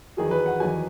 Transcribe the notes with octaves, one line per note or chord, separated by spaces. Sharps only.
E2 D#3 F#3 G#4
B4
F#5
E2 D#3 F#3 G#5